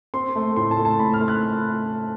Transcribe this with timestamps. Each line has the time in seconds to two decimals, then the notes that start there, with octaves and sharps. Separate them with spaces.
0.14 C4 C6
0.36 A3
0.56 A2 C6
0.71 A5
0.78 A3
0.85 A5
0.99 A2 B5
1.14 F6
1.21 A3
1.28 F#6